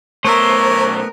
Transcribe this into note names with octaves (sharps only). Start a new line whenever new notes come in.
B1 A3 B3 A#4 C5 C#5 E5